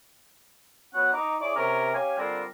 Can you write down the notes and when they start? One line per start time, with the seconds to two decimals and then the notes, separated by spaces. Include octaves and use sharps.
0.94 F#3 B3 C#4 F#5
1.13 D#4 A#5 D6
1.40 E4 G#4 C#5 D5 D6
1.56 C3 C#4 A#4
1.94 C#4 G4 F5 G#5
2.18 D3 G3 C4 D4 F4 A#4